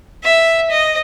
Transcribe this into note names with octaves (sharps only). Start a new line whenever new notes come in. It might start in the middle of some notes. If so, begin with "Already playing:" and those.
E5
D#5